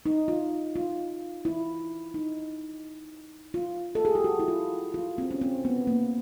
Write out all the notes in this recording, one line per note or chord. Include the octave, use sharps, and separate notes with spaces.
D#4
F4
F4
E4
D#4
F4
A4
G#4
G4
F#4
E4
F4
F4
C4
C#4
C4
B3
A#3